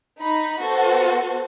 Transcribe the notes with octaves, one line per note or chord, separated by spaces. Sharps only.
D#4 B5
B3 F#4 A4 C5